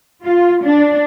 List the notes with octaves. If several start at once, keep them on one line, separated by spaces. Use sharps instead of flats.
F4
D4